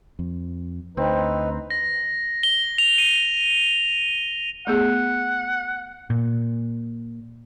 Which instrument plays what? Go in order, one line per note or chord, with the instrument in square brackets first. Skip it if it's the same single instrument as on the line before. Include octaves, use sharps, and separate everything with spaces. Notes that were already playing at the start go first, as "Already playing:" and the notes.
[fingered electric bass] F2
[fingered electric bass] D2 [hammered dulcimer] C4 [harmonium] D#4 B4
[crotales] A#6
G7
F7
D#7
[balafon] A3 B3 G#4 [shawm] F#5
[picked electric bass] A#2